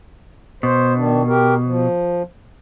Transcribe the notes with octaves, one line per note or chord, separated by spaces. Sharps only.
B2 C5
D#3 D4
G4 A#4
F3